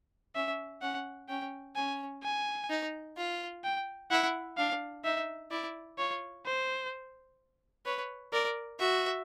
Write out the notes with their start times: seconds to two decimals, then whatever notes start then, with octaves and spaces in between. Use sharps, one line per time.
0.35 C#4 E5
0.82 C#4 F#5
1.29 C#4 G5
1.76 C#4 G#5
2.23 G#5
2.70 D#4
3.17 F4
3.64 G5
4.11 E4 F#5
4.57 D4 F5
5.04 D#4 E5
5.51 E4 D5
5.98 F4 C#5
6.46 C5
7.86 B4 C#5
8.32 A#4 D5
8.79 F#4 E5